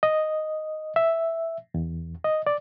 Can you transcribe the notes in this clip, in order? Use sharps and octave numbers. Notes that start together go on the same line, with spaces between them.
D#5
E5
E2
D#5
D5